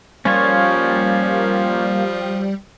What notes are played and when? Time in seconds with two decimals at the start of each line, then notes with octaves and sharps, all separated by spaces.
0.25 F3 G3 A#3 C#4 F4 C#5